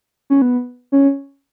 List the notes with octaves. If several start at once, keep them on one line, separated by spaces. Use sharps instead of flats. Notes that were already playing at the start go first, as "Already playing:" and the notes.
C#4
B3
C#4